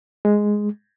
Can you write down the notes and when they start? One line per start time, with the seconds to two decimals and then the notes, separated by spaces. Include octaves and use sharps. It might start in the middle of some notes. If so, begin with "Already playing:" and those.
0.25 G#3